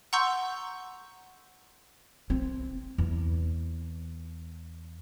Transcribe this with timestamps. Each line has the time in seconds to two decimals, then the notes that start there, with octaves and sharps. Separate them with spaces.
0.13 F#5 A#5 C6 C#6 E6 G6
2.30 C4
2.98 E2